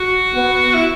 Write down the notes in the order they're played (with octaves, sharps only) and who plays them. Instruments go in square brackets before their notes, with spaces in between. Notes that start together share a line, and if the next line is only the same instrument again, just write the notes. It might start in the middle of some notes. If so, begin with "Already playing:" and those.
Already playing: [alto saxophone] F#4
[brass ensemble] B3
[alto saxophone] E4